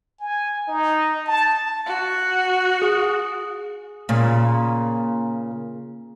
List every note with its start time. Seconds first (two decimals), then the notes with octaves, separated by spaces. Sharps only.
0.20 G#5
0.68 D#4
1.27 A5
1.86 F#4
2.82 G#4
4.09 A#2 C#3